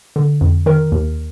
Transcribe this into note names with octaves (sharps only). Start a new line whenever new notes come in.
D3
F2
D#3 A#4
D#2